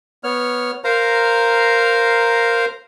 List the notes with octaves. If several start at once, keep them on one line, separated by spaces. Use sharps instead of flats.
B3 C#5 F6
A#4 C5 F5 A#5